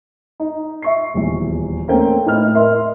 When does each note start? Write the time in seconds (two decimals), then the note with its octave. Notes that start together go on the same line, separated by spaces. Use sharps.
0.40 D#4
0.82 E5 C#6 C7
1.14 D#1 E2
1.88 A3 A#3 C4 C#4 C5 G5
2.27 A2 B4 D#5 F6
2.55 A#4 D#5 E5 C6